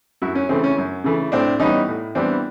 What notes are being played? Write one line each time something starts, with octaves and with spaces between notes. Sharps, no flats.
F#2 E4 F#4
C#4
C#3 E3 A3 C4
C#4
F#2
C#3 E3 A3
A2 C4 D4
E3 G3 B3 C#4 D#4
A2
E3 G3 B3 C4 D4